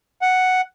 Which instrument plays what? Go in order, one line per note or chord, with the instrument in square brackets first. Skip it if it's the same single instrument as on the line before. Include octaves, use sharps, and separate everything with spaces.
[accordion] F#5